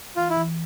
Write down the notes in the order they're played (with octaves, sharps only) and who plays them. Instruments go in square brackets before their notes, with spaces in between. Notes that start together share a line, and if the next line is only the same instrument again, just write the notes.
[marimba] E3 [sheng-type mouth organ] F4
[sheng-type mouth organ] E4
[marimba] E3